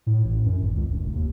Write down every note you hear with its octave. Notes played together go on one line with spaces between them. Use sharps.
A2
A1
F#2
G#1
C#2
E1
F1
D#2